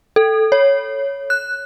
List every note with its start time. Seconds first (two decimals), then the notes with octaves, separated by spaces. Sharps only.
0.16 A4
0.52 C#5
1.30 F#6